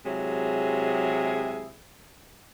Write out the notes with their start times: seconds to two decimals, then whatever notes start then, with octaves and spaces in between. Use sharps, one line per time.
0.05 C3 F#3 G#3 E4 G#4